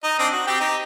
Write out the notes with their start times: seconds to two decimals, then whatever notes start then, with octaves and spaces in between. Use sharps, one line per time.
0.04 D#4 D#5
0.19 C4 D4 D#6
0.32 F#4
0.47 C4 G4 G5
0.60 D#4 G4